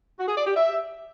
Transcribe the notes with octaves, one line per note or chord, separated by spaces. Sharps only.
F#4
G#4
D5
G4
E5